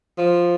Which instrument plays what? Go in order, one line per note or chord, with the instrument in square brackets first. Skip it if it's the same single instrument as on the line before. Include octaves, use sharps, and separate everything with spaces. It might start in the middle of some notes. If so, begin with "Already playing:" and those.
[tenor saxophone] F3